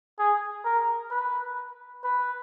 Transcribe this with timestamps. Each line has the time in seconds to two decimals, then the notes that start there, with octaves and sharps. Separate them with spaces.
0.19 G#4
0.64 A#4
1.11 B4
2.04 B4